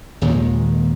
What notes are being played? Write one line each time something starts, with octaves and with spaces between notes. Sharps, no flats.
D#2 A#2 D#3 G#3